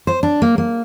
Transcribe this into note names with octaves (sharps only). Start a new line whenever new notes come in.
C5
D4
A#3
A#3